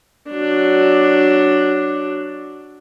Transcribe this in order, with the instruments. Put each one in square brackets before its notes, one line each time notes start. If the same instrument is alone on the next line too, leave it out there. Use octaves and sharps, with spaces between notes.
[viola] F#3 D4